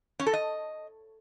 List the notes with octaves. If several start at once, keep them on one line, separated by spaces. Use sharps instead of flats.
C#4
A4
D#5